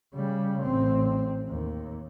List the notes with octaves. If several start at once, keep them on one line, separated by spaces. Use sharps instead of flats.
C#3 G3
A1 C4
D#2